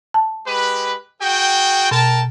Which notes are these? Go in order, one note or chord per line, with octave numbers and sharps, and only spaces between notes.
A5
G#3 G4 B4
F#4 G#4 G5
B2 A#4 G5 A5